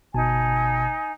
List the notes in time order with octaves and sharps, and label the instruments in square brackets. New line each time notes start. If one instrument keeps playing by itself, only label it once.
[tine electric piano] G1 B2 A5 [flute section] D#4 G#5